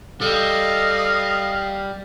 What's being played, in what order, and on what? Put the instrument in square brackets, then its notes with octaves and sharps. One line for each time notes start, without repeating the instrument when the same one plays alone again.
[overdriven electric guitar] G3 [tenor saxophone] A4 [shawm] D#5 [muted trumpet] F5